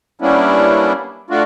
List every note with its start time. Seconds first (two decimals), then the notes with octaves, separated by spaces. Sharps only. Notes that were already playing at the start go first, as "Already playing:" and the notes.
0.21 G3 A#3 B3 C#4 D4 E4
1.30 A3 D4 F4 F#4